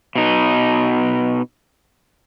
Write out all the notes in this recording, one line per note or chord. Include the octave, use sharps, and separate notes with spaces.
B2 D#4